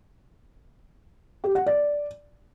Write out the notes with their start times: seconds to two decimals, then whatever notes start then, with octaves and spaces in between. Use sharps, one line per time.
1.44 G4
1.55 F#5
1.66 D5